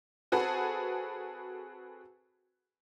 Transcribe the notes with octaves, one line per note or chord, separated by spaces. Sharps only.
C4 F#4 G#4 A4 B4